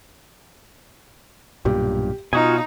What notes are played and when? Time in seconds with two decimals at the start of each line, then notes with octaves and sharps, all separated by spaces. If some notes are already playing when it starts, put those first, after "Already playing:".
1.65 B1 G2 A#2 G4
2.33 B2 D#4 F4 F#4 G#5 D#6